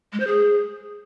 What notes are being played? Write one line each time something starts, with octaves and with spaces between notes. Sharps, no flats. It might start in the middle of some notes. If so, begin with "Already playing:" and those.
G#3
C5
G#4